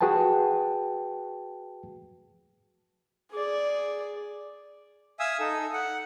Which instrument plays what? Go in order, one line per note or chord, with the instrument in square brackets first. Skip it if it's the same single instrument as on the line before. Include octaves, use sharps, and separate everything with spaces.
[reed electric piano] F#4 G#4 B4 G5 A5
[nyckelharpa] G#4 D5
[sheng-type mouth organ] E5 F5 G#5 D#6 E6
D#4 A4
F#5